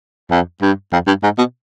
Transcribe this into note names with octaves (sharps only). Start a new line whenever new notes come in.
F2
G2
F2
G2
G#2
B2